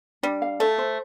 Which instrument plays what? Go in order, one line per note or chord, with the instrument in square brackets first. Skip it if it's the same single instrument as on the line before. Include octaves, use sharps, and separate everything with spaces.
[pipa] G3 [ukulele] D4
[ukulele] F5
[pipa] A3 [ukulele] A4
[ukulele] C5